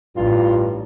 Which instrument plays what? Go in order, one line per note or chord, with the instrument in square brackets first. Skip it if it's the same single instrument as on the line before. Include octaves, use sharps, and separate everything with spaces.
[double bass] A1 [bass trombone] G2 [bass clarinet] F4